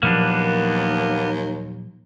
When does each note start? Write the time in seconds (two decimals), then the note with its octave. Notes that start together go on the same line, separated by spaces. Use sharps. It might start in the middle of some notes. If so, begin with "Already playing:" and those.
0.03 D#2 A#2 F3 F#3 A#3 B3 D4